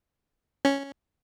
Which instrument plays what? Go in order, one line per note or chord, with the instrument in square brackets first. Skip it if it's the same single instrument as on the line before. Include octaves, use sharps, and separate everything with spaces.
[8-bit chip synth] C#4